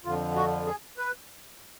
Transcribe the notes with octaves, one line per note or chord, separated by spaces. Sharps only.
F2 D3 F3 F4
F#4
G#4
B4